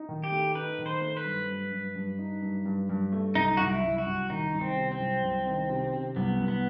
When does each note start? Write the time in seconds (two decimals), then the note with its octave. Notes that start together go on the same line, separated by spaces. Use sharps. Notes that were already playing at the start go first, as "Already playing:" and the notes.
Already playing: D#4
0.09 D#3
0.24 G4
0.32 A3
0.55 D#4 B4
0.79 D#3
0.86 C5
1.01 A3
1.17 B4
1.25 G2
1.49 G2
1.72 G2
1.96 G2
2.19 D#4
2.42 G2
2.66 G2
2.90 G2
3.12 A3
3.35 C2 D#4
3.57 C2 F#4
3.67 E4
3.83 C2
3.98 F#4
4.06 C2
4.30 D#3 D#4
4.53 C2
4.61 C4
4.76 C3
4.92 C4
5.00 C2
5.23 C2
5.47 D#3
5.69 C3
5.93 C3
6.16 C2 B3
6.40 C2
6.48 B3